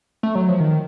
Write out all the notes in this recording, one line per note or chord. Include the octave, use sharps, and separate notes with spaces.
A3
F#3
F3
D#3